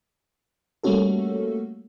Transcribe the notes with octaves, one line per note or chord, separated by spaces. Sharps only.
G3 A3 A#3 C#4 F#4 A4